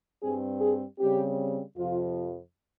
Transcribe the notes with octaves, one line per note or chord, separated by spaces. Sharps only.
G2 G3 C4 G#4
G#4
C#3 G3 C4 G4
F2 C3 F3 F4